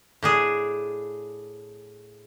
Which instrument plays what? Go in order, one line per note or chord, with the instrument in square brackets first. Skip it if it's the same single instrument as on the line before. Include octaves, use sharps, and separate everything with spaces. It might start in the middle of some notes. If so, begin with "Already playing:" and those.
[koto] A2 D4 G#4